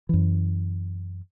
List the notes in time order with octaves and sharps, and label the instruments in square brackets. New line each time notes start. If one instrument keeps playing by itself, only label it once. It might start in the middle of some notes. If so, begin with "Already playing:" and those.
[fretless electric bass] F#2 E3